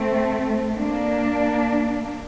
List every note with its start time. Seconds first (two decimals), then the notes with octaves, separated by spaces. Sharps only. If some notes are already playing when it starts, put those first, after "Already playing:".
Already playing: A3 C4
0.76 A#3 D4